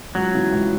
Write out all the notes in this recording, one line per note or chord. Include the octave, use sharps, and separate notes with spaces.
C#2 F#3
C#3 E3
C#2